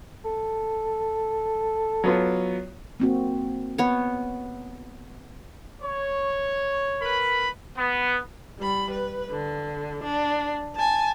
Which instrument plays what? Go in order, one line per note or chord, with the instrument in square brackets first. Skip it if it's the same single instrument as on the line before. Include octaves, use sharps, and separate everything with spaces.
[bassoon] A4
[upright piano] F#3 B3 F4
[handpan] A#3 C4 F#4
[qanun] B3 C#5
[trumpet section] C#5
[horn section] A#4 B4 B5
[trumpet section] B3
[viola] G3 B5
B4
D3
D4
G#5 A5